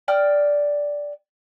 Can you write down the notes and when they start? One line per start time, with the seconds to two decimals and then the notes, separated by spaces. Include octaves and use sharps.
0.08 D5 G5 D#6 F6